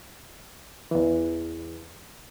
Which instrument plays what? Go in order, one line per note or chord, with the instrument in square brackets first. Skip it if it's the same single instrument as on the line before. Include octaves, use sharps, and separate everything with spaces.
[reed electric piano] E2 E3